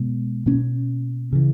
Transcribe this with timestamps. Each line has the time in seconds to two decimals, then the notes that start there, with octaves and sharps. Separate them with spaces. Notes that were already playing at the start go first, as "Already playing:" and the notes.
Already playing: B2 G#3 B3
0.46 B2 A#3 C#4
1.33 C#3 E3